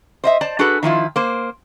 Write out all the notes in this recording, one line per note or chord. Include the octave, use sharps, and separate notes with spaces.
C5 D#5 E5
C5 D5 A5
D4 F#4 G#4 A4 B4
D#3 F3 E4 F4
A#3 C5